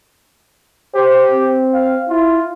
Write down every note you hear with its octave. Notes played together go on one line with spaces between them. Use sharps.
G4 C5
C4
F5
E4 F4